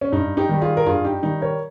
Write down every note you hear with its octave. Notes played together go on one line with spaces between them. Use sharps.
C#4
G2 D#4
D#4 G4
D#3 G3
F4 G#4
A#4
G2 F4 G#4
D#4 G4
D#3 G3 D#4
A#4 C#5